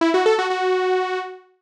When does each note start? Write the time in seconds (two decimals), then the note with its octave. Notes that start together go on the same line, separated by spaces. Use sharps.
0.01 E4
0.14 F#4
0.26 A4
0.39 F#4
0.50 F#4